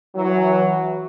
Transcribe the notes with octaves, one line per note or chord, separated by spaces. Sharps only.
E3 F#3